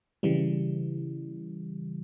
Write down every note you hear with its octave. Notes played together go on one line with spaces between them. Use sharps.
C#3 E3 G3